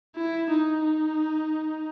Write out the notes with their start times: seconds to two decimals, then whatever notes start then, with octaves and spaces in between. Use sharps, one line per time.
0.16 E4
0.50 D#4
0.84 D#4